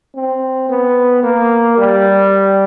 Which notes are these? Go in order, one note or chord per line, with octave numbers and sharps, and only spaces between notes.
C4
B3
A#3
G3